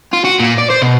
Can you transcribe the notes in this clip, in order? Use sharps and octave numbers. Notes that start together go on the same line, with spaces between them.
F4
F#4
A#2
D5
C5
B2